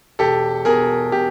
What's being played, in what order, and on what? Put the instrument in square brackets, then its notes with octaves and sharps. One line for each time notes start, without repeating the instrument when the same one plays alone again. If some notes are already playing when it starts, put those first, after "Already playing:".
[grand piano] E1 G4 A4
B2 G#4 A#4
B2 G4